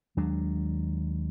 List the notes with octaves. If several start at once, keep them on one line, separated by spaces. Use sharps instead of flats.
D#2 F#3 G#3 D4